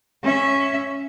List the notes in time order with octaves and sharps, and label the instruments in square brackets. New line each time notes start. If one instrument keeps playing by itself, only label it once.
[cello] C#4 E5